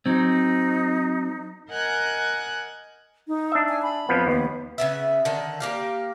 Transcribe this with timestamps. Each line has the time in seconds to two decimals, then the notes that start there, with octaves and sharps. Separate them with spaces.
0.06 F#3 C4 D#4
1.69 A#4 D#5 F#5 G#5 F#6 G6
3.28 D#4
3.52 D4 E5
3.69 G#5
3.82 B5
4.09 F2 F3 B3
4.27 D#2 B3
4.78 C#3 B3 E5
5.25 D3 D#3
5.60 A#3 G4 F5